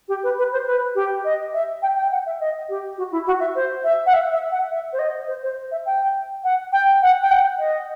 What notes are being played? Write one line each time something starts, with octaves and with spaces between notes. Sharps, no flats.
G4
B4
B4
C5
B4
G4
D#5
E5
G5
G5
F#5
E5
D#5
G4
F#4
E4
F#4
E5
C5
E5
F#5
E5
E5
F#5
E5
C5
D#5
C5
C5
E5
G5
F#5
G5
F#5
G5
F#5
D#5